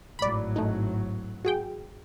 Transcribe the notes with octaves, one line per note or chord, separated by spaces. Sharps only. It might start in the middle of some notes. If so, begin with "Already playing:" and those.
G#1 A2 F#3 D5 B5
A3 D#4
F#4 G#4 G5